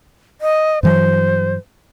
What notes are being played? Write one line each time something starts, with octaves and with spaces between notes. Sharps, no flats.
D#5
G2 E3 F#3 C5